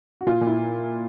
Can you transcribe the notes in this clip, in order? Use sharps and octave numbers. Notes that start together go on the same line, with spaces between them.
F#4
A#2 F4
A#2
E4